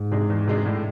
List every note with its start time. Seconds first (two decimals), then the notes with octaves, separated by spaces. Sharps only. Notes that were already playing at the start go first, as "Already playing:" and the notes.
Already playing: G#2
0.11 C3 G#3 D4 G#4
0.30 E2
0.47 C3 G#3 D4 G#4
0.66 A2